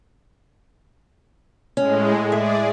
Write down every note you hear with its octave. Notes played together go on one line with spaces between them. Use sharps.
A2 G#3 C#4
G#4 D5 E5